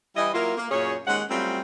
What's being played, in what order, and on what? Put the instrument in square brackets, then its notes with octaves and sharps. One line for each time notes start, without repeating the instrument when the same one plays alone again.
[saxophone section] E3 G3 E4 D#5
F#3 A#3 E4 F4 A#4
A#3
F#2 A#2 C#4 G#4 C#5
D#2 G#3 C#4 F#5
F#3 G3 A3 C4 C#4 F4